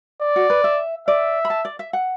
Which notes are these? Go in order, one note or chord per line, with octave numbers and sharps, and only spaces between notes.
D5
F#4
B4
E5
D5 E5
B5
A5
D5
E5
F#5